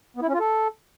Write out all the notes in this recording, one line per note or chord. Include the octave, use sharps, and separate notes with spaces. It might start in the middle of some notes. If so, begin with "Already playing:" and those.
B3
E4
C#4
F4
A4